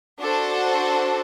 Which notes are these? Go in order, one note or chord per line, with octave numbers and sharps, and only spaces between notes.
D4 F#4 A4 C5